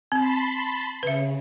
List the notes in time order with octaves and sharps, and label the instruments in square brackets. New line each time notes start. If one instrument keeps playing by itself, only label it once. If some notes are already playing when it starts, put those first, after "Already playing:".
[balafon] C4 [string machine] A5 B5 C6
[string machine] C#3 [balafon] B4 E5